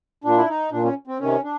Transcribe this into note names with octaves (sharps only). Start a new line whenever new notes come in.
A#2 D4
E4
D#4
A#2 D4
C#4
C4
C3 D#3 C#4
D4